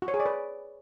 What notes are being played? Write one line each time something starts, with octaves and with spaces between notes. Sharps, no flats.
F#4
C#5
G#4
D5
B4